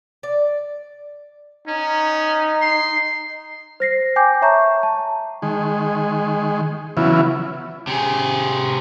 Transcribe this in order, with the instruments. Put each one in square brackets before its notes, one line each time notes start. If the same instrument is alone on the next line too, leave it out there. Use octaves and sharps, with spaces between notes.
[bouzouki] D5
[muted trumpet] C#4 [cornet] D#4
[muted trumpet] C6
[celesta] C5 A#6 C7
G5 G#5 D6 G6
C#5 E5 A5 A#5 C#6 G6
A5
[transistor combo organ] D#3 G#3
C#3 E3 F#3 B3 E4 F4
[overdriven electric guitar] C3 G#4